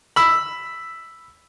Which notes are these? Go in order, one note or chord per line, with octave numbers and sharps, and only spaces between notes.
B5 E6